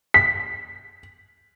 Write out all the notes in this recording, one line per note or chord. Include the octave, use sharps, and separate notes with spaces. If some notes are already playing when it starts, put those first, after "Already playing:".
B6